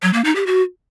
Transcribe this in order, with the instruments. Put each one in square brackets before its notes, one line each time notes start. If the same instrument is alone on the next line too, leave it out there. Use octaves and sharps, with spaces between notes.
[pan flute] F#3
A#3
D#4
G4
F#4